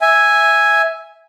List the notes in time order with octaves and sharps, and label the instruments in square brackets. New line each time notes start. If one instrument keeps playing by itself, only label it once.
[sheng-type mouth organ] E5 G#5